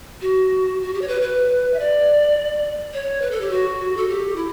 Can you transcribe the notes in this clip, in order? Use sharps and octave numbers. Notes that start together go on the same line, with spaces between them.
F#4
F#4
G4
C#5
B4
B4
E5
D5
C#5
B4
A4
G4
F#4
A4
G4
E4